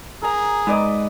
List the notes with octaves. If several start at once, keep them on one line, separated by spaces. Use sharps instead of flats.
G#4 A#4 A#5
G#2 B4 D5 D#5